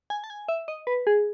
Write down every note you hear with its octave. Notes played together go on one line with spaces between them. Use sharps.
G#5
A5
G#5
E5
D#5
B4
G#4